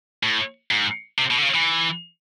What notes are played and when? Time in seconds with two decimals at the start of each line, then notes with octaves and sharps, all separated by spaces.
0.23 A2
0.71 G#2
1.19 C3
1.31 B2
1.38 D3
1.42 C#3
1.55 E3